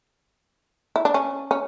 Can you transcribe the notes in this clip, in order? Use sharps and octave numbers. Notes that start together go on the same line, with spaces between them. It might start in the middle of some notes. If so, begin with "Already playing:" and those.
E4
D4
C#4
C#4